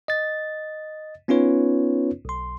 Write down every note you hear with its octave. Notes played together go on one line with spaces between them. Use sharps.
D#5 A6
B3 C#4 D#4 F4 B4 C#5
B1 C6